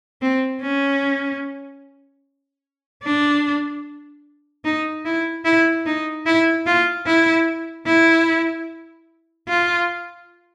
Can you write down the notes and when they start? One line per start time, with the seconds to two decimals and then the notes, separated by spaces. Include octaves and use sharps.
0.22 C4
0.62 C#4
3.03 D4
4.65 D#4
5.05 E4
5.45 E4
5.86 D#4
6.26 E4
6.66 F4
7.06 E4
7.86 E4
9.48 F4